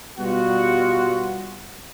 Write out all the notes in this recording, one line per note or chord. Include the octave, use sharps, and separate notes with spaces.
B2 G3 B3 F4 F#4